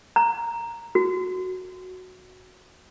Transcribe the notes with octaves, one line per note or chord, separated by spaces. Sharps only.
A#5
F#4